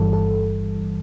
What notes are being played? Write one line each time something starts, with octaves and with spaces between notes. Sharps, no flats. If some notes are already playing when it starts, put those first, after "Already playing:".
Already playing: G1 G2 E3 G3 A4
A4